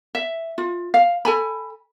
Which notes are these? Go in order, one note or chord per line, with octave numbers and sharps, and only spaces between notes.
E5
F4
F5
A4 G#5 B5